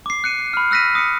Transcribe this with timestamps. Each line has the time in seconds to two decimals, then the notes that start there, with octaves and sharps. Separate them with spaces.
0.06 D6 C7
0.24 F#6 C#7 D#7
0.54 B5 F6
0.71 E6 F#6 A#6 B6 D#7
0.95 D#6 C#7